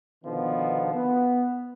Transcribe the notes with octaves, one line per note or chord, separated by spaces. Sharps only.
B2 D3 D#3 F3 B3
B3